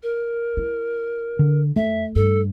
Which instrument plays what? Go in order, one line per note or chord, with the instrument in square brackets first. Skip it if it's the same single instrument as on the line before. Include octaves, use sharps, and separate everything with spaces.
[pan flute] A#4
[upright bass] E4
[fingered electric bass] D3
[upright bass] F2 [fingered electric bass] A3 [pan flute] E5
[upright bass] G2 [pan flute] A4